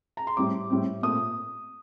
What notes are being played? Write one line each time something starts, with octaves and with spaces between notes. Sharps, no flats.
A#5
C6
A2 G3 C4 D6
A2 G3 C4
A#2 A3 C4 D#6